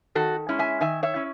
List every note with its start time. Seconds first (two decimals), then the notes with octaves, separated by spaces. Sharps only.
0.15 D#3 F#4 A4
0.49 G#3 C#4 E4
0.59 E5 G#5
0.81 D#3 E5 G#5
1.03 C#5 E5
1.14 C#4 E4